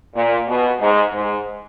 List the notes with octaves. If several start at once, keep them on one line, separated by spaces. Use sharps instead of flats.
A#2
B2
G#2
G#2